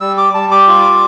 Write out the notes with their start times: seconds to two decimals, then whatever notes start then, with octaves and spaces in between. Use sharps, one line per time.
0.01 G3 E6
0.17 D6
0.34 G3 A5
0.51 D6
0.68 F4